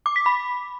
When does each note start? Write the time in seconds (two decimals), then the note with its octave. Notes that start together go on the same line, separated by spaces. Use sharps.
0.06 D6
0.16 B6
0.26 B5